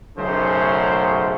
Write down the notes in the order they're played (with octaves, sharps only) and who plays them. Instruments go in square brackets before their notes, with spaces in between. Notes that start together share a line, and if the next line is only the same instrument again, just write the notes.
[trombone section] B1 F#2 C#3 A3 C5